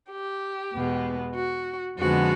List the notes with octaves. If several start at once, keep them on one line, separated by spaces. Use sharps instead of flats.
G4
E2 B2 G#3 B3
F#4
F2 D3 F3 G#3 B3 F#4